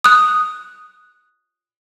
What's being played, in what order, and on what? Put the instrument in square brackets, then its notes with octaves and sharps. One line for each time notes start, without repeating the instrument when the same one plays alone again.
[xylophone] D#6 F#6